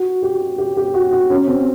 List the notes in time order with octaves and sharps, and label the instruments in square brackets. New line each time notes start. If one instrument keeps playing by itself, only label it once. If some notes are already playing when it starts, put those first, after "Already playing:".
Already playing: [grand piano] F#4
G4
G4
G4
F#4
F#4
C#4
C4